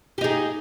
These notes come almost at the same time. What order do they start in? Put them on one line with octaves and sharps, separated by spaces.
G4 D#4 G#4